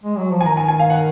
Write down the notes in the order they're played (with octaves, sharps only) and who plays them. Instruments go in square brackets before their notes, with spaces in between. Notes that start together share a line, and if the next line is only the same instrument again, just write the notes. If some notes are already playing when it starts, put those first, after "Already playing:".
[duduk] G#3
F#3
F3
[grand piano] G#5
[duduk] D#3 [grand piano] A#5
[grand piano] G#5
G#5
F5
F#5